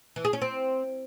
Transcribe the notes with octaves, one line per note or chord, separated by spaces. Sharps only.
E3
G#4
C#4
C4